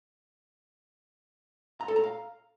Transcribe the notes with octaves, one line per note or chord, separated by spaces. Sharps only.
A#5
A4
A#5
F5